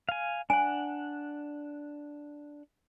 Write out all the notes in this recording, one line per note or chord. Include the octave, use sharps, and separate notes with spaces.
F5 G#5
D4 F#5 G#5